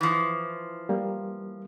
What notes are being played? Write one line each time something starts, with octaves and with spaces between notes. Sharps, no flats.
E3 F3
G3 A#3